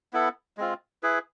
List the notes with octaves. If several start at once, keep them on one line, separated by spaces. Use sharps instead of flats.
B3 E4 A4
G#3 C4 F4
E4 G#4 B4